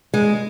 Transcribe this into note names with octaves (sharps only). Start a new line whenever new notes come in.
G#3